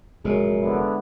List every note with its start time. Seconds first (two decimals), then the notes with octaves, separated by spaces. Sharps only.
0.25 F1 F#2 A#2 G#3
0.62 D3 B3 E4